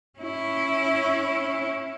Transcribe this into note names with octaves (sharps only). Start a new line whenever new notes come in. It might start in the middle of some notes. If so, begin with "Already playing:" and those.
C#4 E4